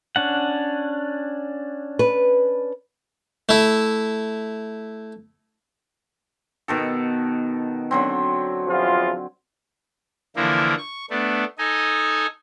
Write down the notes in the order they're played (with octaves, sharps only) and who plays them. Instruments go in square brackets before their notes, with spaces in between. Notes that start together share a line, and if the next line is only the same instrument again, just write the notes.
[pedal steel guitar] C#4 D4 F#5
[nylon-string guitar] B4
[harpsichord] A3 E4
[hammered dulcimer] B2 D#3 A4
D3 F#3 C4
[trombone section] E2 F3 F4
[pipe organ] D3 E3 F3 A#3 E4 A#4
C#6
A3 B3 D4
D#4 A4 D#5 G#5